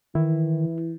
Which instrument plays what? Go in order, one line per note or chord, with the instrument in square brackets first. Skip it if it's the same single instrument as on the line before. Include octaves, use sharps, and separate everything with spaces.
[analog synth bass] D#3 [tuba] E3 [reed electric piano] E4